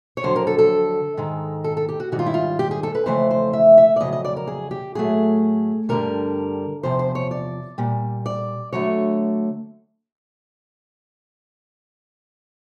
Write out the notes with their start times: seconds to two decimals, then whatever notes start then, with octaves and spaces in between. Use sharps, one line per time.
0.17 C#5
0.23 F2 D3 F#3 C5
0.36 A#4
0.47 A4
0.59 A4
1.17 G#2 D#3 G#3
1.64 A4
1.77 A4
1.89 G4
2.00 F#4
2.12 G#2 D#3 G3 F#4
2.19 F4
2.26 E4
2.34 F4
2.59 G4
2.71 G#4
2.83 A4
2.95 B4
3.06 F2 C#3 E3 A3 C5
3.31 C5
3.53 E5
3.78 E5
3.96 D5
4.01 F2 C#3 F#3 D#5
4.13 D#5
4.25 D5
4.37 A#4
4.47 G#4
4.71 G4
4.95 A2 F#3 A3 G#4
5.89 G2 D3 G3 A#4
6.83 E2 C3 F3 C5
6.99 C5
7.15 C#5
7.31 D5
7.78 A#2 G3
8.26 D5
8.73 D3 F#3 A3 C#5